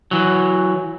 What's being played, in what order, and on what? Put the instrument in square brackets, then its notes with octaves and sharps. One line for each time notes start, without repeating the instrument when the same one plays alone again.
[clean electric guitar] E3 F#3